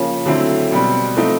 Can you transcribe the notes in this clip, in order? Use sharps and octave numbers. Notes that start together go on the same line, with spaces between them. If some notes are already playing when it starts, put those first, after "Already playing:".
Already playing: C#3 F3 A#3 C#4
D3 F#3 A3 C4 E4
B2 G3 C4
F3 A3 C4 D#4